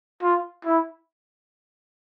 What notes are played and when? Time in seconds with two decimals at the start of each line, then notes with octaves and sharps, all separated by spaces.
0.22 F4
0.65 E4